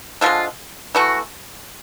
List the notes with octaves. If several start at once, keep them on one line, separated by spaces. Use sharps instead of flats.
D3 F3 G#3 F4
E3 A3 F#4